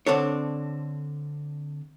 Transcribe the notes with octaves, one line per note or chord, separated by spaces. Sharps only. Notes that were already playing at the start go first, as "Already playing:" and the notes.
D3 C4 D4 A4 C#5